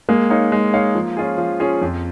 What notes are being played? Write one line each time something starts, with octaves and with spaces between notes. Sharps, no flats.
G#3 A#3
D#4 C#5 F5
G#3
D#4 C#5 F5
F3
C#4 F4 G#4
F3
C#4 F4 G#4
F2